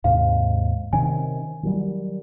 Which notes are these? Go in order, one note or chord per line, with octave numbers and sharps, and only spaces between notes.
D#2 G#2 C3 F5
C3 D#3 C#4 G#5
D#3 F#3 G3